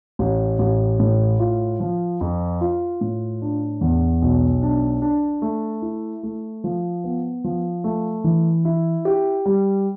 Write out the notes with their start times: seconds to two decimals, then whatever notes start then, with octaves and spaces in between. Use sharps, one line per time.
0.19 A1
0.59 A1
1.00 A2
1.39 F4
1.80 F3
2.21 F2
2.61 F4
3.01 A2
3.42 D4
3.81 E2
4.22 B1
4.62 D4
5.02 D4
5.42 A3
5.82 E4
6.23 A3
6.64 F3
7.04 B3
7.44 F3
7.84 A3
8.24 E3
8.65 E4
9.05 G4
9.46 G3